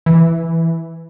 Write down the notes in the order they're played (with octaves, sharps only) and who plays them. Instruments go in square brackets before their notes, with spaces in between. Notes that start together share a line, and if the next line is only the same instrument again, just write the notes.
[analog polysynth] E3